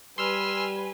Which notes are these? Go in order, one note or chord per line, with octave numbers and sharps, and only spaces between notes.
G3 B4 G#5 C6 E6 F6